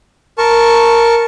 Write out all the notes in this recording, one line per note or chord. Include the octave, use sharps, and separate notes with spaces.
A#4 A5 C#6